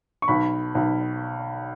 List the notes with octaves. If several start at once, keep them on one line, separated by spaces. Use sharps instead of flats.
C#6
B1 B5
B1